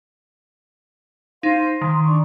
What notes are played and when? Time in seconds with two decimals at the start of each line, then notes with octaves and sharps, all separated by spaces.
1.43 D#4 C5 F5 C6
1.81 D#3 C6
2.04 D4 A#5 C#6